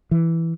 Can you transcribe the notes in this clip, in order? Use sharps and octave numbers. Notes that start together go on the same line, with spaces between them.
E3